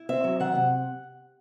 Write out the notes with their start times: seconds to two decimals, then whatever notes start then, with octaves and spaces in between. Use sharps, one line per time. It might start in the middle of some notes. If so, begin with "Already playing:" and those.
Already playing: E4
0.09 C4 E5
0.24 F#3
0.40 D#3 F#5
0.55 C3